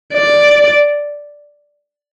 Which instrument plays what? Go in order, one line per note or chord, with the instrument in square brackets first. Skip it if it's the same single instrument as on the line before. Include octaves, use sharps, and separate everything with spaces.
[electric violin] D5